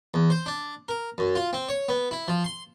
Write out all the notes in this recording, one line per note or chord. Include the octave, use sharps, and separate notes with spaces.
E2
C5
D4
A#4
F#2
F4
C4
C#5
B3
E4
F3
C6